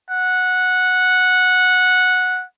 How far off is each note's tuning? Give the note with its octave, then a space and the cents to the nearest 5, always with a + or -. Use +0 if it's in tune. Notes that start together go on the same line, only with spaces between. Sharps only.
F#5 -10